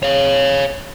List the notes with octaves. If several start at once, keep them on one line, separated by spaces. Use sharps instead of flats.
C#5 F5